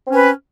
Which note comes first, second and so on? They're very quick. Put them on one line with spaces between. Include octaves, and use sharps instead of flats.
C4 C#4 B4